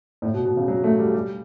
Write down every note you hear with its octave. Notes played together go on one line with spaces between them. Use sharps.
A2
B2
B2
C#3
F#3
A3
G3
G3